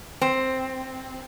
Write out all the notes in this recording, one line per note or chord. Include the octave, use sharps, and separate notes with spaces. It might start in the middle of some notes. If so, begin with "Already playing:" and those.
C4